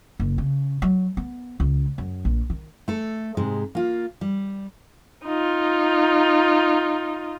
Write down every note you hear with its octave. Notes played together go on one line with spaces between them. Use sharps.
F#1
C#3
F#3
B3
C#2
F#2
A#1
D#3
A3 A4
G#2 C3 G#3
A#3 F4
G3
D#4 F4